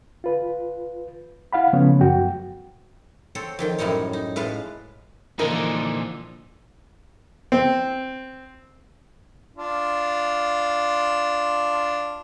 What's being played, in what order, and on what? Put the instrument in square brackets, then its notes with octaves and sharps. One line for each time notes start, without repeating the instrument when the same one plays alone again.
[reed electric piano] F4 B4
E4 F5 F#5 B5
C#3 F3 A3 B3 C#4
F#2 F#4 G5
[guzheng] C4 A4 C5 C#5
F2 D#3 G5
F#2 A2 G3 D#4 C#5
D#4
A2 G#3 B4 F5 A5
[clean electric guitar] A#2 D3 D#4 [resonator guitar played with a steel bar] E3 F3 A#4
[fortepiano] C4
[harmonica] D4 F4